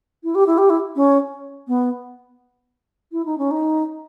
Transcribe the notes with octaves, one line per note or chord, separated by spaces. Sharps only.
E4
G4
E4
G4
E4
C#4
B3
E4
D#4
C#4
D#4